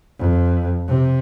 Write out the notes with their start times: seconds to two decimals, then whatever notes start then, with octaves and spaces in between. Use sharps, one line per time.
0.19 F2
0.88 C3